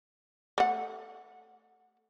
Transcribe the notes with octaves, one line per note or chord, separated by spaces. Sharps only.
A3 F#5